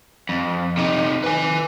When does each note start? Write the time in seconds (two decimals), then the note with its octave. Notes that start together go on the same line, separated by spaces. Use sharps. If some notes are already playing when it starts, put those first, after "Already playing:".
0.29 F2
0.77 C3 D#4
1.24 B4 G#5